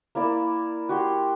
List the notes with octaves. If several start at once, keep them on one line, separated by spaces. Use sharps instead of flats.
A#3 E4 D5 A5
F#4 G4 C6